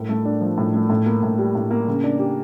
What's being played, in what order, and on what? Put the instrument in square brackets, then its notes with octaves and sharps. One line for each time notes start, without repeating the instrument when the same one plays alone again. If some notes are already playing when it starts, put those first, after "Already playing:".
Already playing: [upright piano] A2 A#4
A3
D4
F3
A2
A3
A2
A#3
A2
G3
A2
A#3
C#3
D4
G4